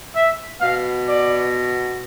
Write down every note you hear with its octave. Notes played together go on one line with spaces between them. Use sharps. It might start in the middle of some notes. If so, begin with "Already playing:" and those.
E5
B2 B3 F5
D5